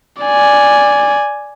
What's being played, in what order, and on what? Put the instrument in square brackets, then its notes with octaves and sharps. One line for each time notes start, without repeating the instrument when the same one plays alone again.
[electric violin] D5 G#5